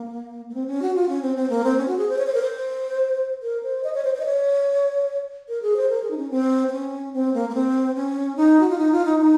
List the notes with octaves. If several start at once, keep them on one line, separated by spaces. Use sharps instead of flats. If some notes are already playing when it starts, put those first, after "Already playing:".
Already playing: A#3
A#3
C4
C#4
F#4
F4
C#4
C4
C4
A#3
C4
C#4
F#4
G#4
C5
C#5
C5
A#4
C5
A#4
C5
D#5
C#5
C5
C5
D#5
C#5
A#4
G#4
C5
A#4
G#4
D#4
C#4
C4
C4
C#4
C4
A#3
A#3
C4
C#4
D#4
F#4
F4
D#4
F4
D#4
D#4